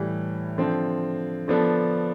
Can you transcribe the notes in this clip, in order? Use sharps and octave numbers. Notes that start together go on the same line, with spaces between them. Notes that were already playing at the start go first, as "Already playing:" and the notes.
Already playing: A2 E3 G3
D3 F3 C4
D3 F3 B3 D4 A4